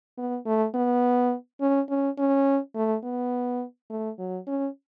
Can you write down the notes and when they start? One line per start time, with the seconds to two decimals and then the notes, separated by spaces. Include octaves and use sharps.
0.18 B3
0.46 A3
0.74 B3
1.61 C#4
1.89 C#4
2.18 C#4
2.75 A3
3.03 B3
3.90 A3
4.19 F#3
4.47 C#4